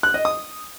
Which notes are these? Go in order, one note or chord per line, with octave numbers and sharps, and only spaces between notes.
F#6
D#5
D#6